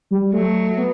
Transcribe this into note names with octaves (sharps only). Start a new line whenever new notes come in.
G3
F#3 A3
B3